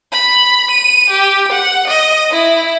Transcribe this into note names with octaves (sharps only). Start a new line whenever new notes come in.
B5
D#7
G4
F#5
D#5
E4